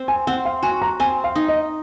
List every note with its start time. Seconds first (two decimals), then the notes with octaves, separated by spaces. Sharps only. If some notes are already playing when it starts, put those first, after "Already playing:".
Already playing: C4
0.08 G#5
0.27 C4 F#5
0.45 F5
0.63 F#4 G#5
0.82 A#5
1.00 C4 G#5
1.24 F5
1.36 D#4
1.48 D#5